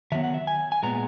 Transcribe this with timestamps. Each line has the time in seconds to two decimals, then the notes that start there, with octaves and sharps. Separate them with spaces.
0.12 D#3 F#3 B3 E5
0.23 F#5
0.34 E5
0.47 G#5
0.72 G#5
0.83 A#2 G#3 B3 A#5